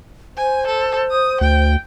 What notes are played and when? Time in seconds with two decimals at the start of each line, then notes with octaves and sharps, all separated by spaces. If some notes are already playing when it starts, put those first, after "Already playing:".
0.37 C5 G#5
0.67 A4
1.10 D#6
1.41 D2 G5